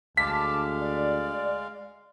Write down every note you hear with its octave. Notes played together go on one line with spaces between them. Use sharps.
D2 G#3 F5 A5 D6 B6
D5